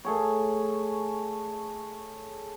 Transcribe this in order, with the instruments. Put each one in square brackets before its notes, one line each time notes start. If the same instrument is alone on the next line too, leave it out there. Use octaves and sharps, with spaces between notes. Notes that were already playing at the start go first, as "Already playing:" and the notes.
[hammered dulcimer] A3 G#4 C#5